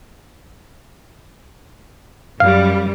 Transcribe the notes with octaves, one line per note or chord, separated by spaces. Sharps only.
F#2 G3 F5